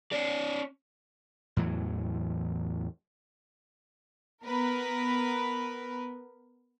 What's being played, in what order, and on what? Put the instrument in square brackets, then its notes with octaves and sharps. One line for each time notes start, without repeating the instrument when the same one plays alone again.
[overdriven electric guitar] C#4 D5
[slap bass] E2 A2 E3 F#3
[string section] B3 A#4 B4